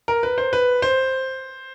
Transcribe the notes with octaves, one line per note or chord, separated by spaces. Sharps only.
A#4
B4
C5
B4
C5